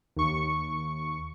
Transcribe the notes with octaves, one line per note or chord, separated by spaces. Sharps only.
D#2 C#6